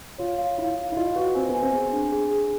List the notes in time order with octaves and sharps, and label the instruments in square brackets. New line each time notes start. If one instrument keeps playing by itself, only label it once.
[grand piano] F4 [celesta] C#5
[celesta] F5
[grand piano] E4 [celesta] F5
[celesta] F5
[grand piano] E4
[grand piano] F4 [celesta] D#5
[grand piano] F#4 [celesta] B4
[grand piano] C4 [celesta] G#5
[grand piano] B3
[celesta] G#5
[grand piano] C4
[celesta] G#4
D4
G#4
G#4